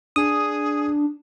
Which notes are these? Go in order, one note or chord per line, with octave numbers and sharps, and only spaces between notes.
D4 G#4 D#6